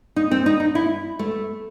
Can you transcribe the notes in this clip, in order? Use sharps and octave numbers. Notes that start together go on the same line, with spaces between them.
D#4
C4
D#4
D#4
E4
A3